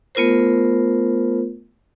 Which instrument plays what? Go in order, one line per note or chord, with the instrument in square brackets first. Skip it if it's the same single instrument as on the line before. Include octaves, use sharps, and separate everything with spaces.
[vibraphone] A3 B3 F4 A#4 C5